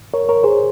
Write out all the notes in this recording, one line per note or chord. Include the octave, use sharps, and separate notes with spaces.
A#4 C#5
A#4 C#5
G#4 C5